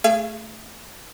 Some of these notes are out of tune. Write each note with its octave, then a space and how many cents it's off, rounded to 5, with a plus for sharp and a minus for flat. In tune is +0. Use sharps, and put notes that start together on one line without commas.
A3 +0 G#4 +0 F5 -45